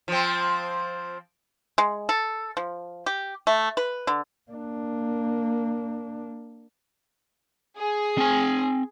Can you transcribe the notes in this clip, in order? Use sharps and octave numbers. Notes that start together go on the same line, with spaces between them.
F3 C4
G#3
A4
F3
G4
A3
B4
D3
A#3 D4
G#4
C4 G#5